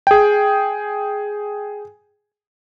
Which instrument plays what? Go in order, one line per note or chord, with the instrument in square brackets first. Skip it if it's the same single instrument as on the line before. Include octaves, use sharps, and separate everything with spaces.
[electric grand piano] G#4 G5